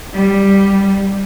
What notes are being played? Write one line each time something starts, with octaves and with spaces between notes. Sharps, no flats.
G3